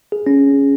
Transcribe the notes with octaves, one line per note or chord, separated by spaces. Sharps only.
G#4
C#4